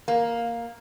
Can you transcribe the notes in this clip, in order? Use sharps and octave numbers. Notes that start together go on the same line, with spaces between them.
A#3